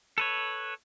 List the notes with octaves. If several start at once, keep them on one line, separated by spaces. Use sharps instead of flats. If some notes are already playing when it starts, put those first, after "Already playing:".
A4 B4 C#5